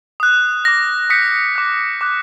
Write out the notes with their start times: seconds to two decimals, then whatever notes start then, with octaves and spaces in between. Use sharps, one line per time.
0.20 D#6 F#6
0.64 F6 A#6
0.68 D6
1.10 D#6 G6 B6 C#7
1.56 D6 F#6
2.01 D6 F#6